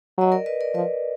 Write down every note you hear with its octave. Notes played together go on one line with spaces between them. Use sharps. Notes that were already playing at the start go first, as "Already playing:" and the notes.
F#3 D#5
A#4 D5
B4 D#5
A#4 D5
F3 B4 D#5